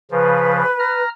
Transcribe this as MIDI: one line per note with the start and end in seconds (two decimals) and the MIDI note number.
0.11 0.63 49
0.11 0.63 53
0.11 1.02 71
0.79 1.09 82
0.79 1.09 89